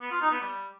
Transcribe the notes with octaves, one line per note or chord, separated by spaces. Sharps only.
B3
F4
D#4
B3
G3